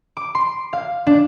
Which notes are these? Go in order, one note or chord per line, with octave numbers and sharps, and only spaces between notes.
D6
C6
F5
D4